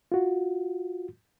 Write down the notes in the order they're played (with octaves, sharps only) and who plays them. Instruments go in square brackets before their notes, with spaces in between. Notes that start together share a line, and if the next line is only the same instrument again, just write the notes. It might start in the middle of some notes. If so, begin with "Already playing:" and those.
[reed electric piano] F4 F#4